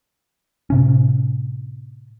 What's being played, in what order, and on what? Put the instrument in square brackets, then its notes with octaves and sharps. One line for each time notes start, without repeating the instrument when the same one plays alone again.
[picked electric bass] A2 C3 C#4